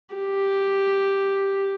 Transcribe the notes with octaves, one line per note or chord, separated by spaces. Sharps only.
G4